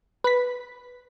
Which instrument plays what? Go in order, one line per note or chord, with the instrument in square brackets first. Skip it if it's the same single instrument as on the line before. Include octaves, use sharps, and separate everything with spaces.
[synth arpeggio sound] B4 B6